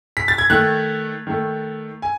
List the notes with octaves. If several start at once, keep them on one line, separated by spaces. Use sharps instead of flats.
B6
A6
G#6
D#3 A3 F#6
D#3 A3
G#5